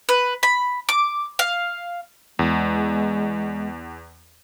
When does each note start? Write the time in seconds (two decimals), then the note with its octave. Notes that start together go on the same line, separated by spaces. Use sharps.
0.09 B4
0.43 B5
0.89 D6
1.39 F5
2.39 E2 G#3